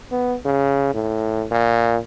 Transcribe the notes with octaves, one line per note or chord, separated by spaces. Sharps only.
B3
C#3
A2
A#2